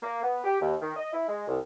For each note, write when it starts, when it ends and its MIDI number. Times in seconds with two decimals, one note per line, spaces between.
0.03 0.21 58
0.22 0.42 59
0.44 0.57 67
0.60 0.74 39
0.81 0.92 51
0.96 1.11 75
1.13 1.24 64
1.28 1.45 56
1.48 1.58 36